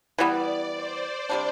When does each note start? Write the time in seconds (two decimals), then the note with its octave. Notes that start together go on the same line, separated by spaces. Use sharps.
0.18 E3 G3 B3 D5
0.73 C5
1.29 C3 G3 D4